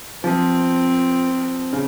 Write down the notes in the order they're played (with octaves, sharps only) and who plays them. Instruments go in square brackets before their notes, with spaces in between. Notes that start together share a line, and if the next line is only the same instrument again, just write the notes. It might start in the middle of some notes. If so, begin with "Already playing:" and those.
[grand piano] F3 [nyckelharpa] C4
[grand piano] C#3